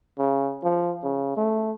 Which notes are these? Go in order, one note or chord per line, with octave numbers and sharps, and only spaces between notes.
C#3
F3
C#3
A3